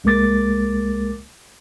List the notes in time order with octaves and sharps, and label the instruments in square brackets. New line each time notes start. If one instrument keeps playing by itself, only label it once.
[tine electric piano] C2 G#3 A#3 A#4 D6 A6